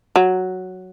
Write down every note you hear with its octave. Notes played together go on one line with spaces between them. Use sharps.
F#3